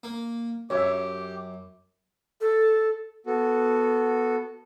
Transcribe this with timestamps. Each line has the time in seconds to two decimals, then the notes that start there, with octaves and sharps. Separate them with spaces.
0.03 A#3
0.70 F#2 G4 C#5 E5
2.41 A4
3.26 B3 F#4 A4